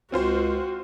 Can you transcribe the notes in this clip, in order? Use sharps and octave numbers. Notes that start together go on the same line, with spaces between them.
C#2 C4 F4 F#4 C5